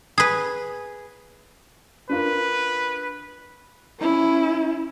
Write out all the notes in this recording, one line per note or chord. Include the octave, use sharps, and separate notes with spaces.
G#4 B4
D4 F4 A#4 B4
C#4 E4